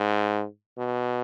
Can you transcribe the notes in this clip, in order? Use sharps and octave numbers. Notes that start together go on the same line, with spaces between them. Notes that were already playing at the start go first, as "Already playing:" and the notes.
Already playing: G#2
B2